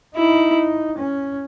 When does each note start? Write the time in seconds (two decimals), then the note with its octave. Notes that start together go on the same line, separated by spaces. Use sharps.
0.16 D#4 E4
0.98 C#4